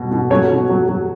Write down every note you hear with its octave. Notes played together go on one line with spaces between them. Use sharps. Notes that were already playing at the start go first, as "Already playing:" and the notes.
Already playing: B2 F#3
B2
F#3 C#4 C#5
B2
F#3
F#3